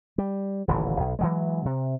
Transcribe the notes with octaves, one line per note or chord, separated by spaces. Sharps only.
G3
D#1 A1 D3 E3
B1
E3 F#3 G#3
C3